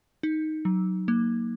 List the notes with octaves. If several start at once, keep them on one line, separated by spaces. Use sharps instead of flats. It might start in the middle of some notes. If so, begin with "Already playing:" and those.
D#4
F#3
A#3